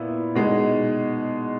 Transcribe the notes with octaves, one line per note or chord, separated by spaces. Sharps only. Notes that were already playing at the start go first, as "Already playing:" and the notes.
Already playing: A#2 B3 E4
B2 G#3 D#4